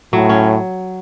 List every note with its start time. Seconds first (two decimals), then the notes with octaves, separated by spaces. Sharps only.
0.13 A2 F#3
0.29 C#4